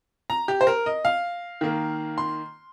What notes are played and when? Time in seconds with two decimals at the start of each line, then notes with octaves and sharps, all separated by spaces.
0.30 A#5
0.48 G4
0.61 C5
0.67 A#4
0.86 D#5
1.05 F5
1.61 D#3 A#3
2.18 C6